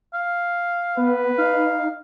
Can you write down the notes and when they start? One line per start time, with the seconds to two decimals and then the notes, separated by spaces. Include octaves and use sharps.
0.14 F5
0.97 B3 B4
1.38 D#4 F5